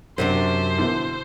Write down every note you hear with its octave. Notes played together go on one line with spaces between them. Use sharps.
F#2 C3 C4 D4 C5
B2 D3 E3